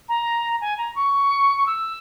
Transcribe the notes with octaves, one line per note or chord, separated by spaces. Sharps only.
A#5
G#5
A#5
C#6
C#6
E6